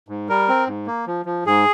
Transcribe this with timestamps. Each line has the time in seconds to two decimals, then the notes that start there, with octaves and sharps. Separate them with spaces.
0.08 G#2
0.29 G3 A#4
0.49 C4
0.68 G#2
0.87 A#3
1.07 F3
1.26 F3
1.46 G#2 G#4